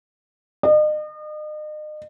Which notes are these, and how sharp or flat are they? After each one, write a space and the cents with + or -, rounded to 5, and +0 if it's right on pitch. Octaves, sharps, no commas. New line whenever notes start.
D#5 -40